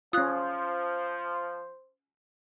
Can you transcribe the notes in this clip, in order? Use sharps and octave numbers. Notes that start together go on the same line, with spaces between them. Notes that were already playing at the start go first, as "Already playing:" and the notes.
F3 C#4 F4 C5 D#6 F#6